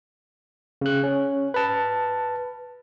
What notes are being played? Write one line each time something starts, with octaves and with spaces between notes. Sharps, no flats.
C#3 F#6
C#4
B4 A5